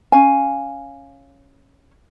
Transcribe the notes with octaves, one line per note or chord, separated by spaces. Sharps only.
C#4 F5 G#5